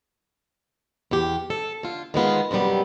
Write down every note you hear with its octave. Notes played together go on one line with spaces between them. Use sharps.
E2 G4
A4
D3 F4
D#3 G#3 B3 F4
F#2 C3 D#3 G3 B3